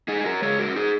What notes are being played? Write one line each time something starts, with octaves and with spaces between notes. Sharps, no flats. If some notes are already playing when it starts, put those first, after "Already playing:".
D#4 G#4
G#4
F#4 A#4
C#3 G#3 G#4 C#5
F#4 A#4
D#4 G#4